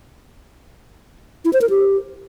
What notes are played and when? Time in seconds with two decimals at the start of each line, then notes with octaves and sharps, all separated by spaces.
1.45 E4
1.53 C5
1.61 A#4
1.70 G4